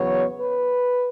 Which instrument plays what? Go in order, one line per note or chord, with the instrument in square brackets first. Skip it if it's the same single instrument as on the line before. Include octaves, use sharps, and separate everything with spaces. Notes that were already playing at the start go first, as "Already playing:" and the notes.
Already playing: [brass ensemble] E2 C#3 F#3 B3 C#5
B4